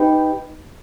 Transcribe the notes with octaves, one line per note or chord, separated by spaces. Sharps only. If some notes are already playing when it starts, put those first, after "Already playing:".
Already playing: D#4 G4 B4